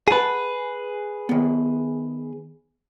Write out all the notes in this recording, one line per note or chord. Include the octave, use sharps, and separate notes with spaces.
G#4 B4 F#5 A5
D#3 B3